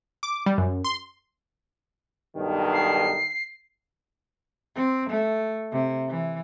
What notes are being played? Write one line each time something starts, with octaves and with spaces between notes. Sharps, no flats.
D6
G3
F#2
C6
B1 G2 D#3
C7
C4
A3
C3
E3